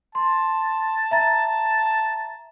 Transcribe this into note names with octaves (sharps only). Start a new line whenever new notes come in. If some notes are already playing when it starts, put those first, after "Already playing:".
A5 C6
E5 A#5 A6